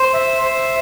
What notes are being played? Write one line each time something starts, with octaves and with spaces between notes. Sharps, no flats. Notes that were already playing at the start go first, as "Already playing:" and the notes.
Already playing: C5
E5
C5